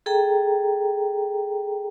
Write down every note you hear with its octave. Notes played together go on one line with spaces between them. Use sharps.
G#4 A4 G5 A#5